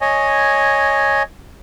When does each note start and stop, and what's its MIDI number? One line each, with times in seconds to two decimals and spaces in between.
0.01 1.23 73
0.01 1.23 75
0.01 1.23 80